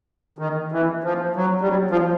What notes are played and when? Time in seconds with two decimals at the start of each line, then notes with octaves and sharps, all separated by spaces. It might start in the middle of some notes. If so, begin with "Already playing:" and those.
0.39 D#3
0.72 E3
1.04 F3
1.36 F#3
1.61 G3
1.68 F#3
1.91 F3